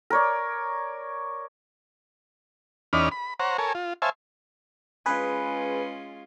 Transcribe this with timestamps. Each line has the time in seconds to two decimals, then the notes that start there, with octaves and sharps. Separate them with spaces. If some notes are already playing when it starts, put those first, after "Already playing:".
0.10 A#4 C#5 D5
2.93 E2 C#4 D#4 D5 B5 F6
3.12 B5
3.40 C5 C#5 F#5 A#5
3.58 A4 A#4 C#5 G#5
3.75 F4
4.02 C5 C#5 E5 F5 G#5 A5
5.06 G#3 C#4 F4 G#4 B4